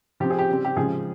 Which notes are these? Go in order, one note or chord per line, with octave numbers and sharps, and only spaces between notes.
F3 C4 G4
G#4
G4
C#3 G3 C4
G4
C#3 F3 G#3 G#4